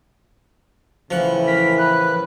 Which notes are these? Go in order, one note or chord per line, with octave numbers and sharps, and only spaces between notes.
A2 C#3 E3 F3 F#5
A#4 B6
B4 F#6